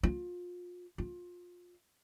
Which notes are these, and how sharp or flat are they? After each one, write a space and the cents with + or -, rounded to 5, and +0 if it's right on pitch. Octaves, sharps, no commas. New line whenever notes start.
F4 +30
F4 +25